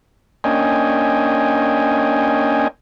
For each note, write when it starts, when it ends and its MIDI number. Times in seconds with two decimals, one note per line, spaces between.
0.44 2.68 58
0.44 2.68 61
0.44 2.68 62
0.44 2.68 75
0.44 2.68 79
0.44 2.68 80